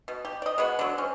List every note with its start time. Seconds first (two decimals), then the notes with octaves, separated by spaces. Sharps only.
0.08 B2
0.25 G4
0.42 D5 D#5
0.58 G#3 B3 F#4
0.79 D3 F#3
0.98 C4 C#4